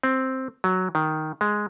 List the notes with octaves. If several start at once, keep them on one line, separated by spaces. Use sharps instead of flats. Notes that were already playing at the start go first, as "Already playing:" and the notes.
C4
F#3
D#3
G#3